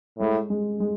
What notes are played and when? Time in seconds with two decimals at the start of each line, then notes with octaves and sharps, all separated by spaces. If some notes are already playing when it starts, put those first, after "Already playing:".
0.19 A2 G#3
0.50 G#3
0.80 G#3